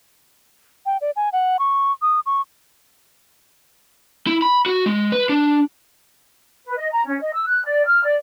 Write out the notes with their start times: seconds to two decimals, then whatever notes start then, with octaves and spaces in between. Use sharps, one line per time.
0.86 G5
1.01 D5
1.16 G#5
1.33 F#5
1.59 C#6
2.02 D#6
2.26 C#6
4.27 E4
4.42 B5
4.66 F#4
4.86 G#3
5.12 B4
5.29 D4
6.65 B4
6.77 D#5
6.92 A#5
7.06 C#4
7.20 D#5
7.33 E6
7.46 F#6
7.65 D5
7.85 F6
8.04 D5